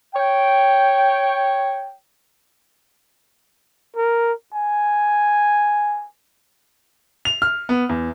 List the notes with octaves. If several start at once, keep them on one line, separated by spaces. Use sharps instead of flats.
C#5 G5
A#4
G#5
F7
F6
B3
E2